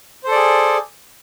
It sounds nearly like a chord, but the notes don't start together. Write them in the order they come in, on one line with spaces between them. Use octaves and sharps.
C5 A4 D5 G#4